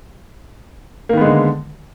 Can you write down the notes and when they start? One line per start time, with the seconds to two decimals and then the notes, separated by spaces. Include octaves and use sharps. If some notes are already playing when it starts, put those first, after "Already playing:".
1.09 A#3
1.13 D#3
1.17 B3
1.21 G#3
1.25 D3